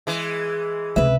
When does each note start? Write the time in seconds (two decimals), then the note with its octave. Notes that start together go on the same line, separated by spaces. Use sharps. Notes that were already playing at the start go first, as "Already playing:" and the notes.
0.07 E3 G#3
0.96 C#2 C3 B4 E5